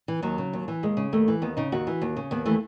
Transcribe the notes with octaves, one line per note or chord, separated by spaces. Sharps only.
E3
D#2 F#3
C#3
D#2
E3
D#2 G#3
C#3
D#2 A3
E3
D#2 B3
C#3 D#4
D#2 F#4
E3
D#2
C#3
D#2 B3
E3 A3